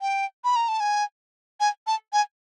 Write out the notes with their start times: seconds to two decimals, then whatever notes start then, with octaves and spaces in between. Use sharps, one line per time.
0.01 G5
0.44 B5
0.56 A#5
0.68 A5
0.80 G#5
1.60 G#5
1.87 A5
2.13 G#5